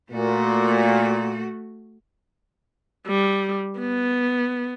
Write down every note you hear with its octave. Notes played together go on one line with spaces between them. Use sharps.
A#2 A3 F#4
G3
B3